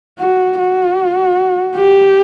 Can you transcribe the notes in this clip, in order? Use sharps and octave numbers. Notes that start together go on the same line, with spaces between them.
F#4
F#4
G4